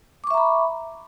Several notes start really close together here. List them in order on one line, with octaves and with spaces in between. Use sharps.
D6 C#6 E5 A#5 B5